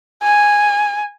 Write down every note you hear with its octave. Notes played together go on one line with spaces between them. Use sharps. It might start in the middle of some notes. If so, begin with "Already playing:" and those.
G#5